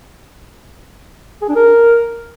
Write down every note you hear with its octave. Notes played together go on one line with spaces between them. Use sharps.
G#4
D4
A#4